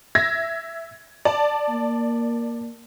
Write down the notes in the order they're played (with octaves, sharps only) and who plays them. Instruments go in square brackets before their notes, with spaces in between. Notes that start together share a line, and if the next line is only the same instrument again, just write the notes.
[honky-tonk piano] E5 G#6 A#6
D5 A5
[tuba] A#3